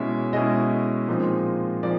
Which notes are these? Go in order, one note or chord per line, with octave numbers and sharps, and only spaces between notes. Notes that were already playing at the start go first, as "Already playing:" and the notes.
Already playing: B2 G#3 C#4 E4 E5
B2 G#3 C#4 E4 D#5
A#2 F3 G#3 C4 D#4
A#2 F3 D5